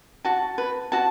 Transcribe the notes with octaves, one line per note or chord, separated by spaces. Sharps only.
F#4 A5
B4
F#4 A5